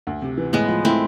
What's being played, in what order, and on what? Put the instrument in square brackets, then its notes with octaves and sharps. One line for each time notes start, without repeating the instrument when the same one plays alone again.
[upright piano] D2
C3
E3
[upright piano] A2 [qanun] G#3 B3
[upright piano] F3
[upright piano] A3 [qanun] C4 E4